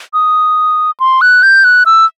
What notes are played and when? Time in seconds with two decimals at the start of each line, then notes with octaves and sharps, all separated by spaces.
0.14 D#6
1.00 C6
1.21 F#6
1.43 G6
1.64 F#6
1.86 E6